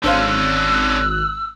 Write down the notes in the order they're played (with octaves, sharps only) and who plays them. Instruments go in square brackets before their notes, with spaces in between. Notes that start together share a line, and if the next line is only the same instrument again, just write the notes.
[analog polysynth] G#1 F#6 [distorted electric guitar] D3 C#4 [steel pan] D4 C5 F5 [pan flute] E6